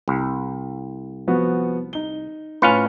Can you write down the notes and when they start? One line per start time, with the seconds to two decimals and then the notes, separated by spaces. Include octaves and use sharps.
0.08 C2
1.27 F3 B3 F#4
1.93 D#4 G7
2.62 A2 C#4 F4 B4 A#5 C#7